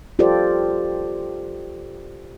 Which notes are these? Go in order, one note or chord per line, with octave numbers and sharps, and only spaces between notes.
F4 G4 A4 C5 D5